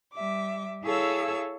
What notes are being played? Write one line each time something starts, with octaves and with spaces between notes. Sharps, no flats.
G3 E5 D6
E4 G#4 A4 C#5 F5 E6